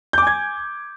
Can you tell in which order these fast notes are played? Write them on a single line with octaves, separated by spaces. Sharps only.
G6 D6 G#5 G#6